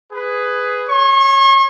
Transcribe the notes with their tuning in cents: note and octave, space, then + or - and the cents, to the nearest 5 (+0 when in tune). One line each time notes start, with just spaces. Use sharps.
G#4 +0 B4 +15
C#5 +0 C#6 -40